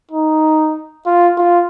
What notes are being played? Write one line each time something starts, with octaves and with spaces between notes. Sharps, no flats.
D#4
F4
F4